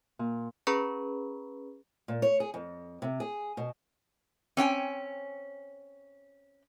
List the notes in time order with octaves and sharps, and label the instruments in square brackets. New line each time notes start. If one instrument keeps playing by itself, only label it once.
[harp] A#2
[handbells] C#4 G#4 B4 A#5 B5 C#6
[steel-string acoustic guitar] A#2
C#5
G#4
F2
C3
G#4
B2
[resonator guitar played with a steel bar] C4 C#4 G5 G#5